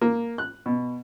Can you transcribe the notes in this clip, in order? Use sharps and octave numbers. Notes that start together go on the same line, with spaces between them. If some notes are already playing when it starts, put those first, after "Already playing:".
A#3
F#6
B2